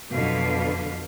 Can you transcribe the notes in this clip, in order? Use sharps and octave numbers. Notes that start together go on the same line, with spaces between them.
F2 B2 D3 F#3 B4 F5